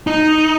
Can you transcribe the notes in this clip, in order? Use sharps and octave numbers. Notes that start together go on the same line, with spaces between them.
D#4